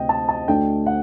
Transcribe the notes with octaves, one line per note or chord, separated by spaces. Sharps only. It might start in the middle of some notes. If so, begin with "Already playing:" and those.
Already playing: D2 C3 D#5 G5
A5
A5
D2 D3 A3 D4 G5
F#5